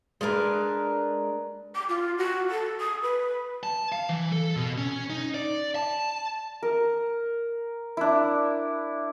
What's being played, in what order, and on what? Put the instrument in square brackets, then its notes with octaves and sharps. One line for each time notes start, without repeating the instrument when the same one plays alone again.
[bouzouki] G#3 D4 A#4 B4
[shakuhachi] D6
F4
F#4
A4
D#6
B4
[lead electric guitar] A5
F5
E3
A4
B2
C#4
D#4
D5
A5
[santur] A#4
D4 E4